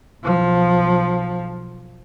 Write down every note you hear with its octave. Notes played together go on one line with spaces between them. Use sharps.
B1 F3